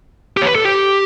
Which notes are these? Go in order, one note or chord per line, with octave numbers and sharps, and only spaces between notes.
G4
C#5
B4
A4
G4